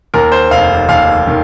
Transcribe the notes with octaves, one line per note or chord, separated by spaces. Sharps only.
D#2 A#4
C5
F1 F5
D#2 F5
D#3